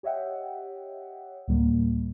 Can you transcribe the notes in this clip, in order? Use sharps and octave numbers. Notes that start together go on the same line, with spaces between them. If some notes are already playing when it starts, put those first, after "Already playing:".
G4 C#5 D#5 E5 F#5 G5
D2 A2 G3 A#3